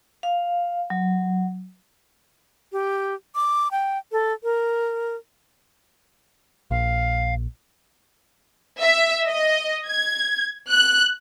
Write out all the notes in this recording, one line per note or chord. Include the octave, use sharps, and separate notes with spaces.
F5
F#3
G4
D6
G5
A4
A#4
A#1 F5
E5
D#5
G#6
F#6